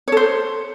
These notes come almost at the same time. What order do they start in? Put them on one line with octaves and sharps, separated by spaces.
C#5 A4 C5